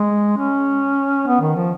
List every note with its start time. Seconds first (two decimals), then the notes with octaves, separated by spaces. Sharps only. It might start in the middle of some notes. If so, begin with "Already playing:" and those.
Already playing: G#3
0.37 C#4
1.27 B3
1.41 D#3
1.56 F3